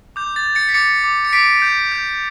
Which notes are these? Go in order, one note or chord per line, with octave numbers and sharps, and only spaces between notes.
D6 G6
A6
G6
A6 C#7
B6
D6 A6 C#7
D6
C#7
D6 B6 D7
G6
G6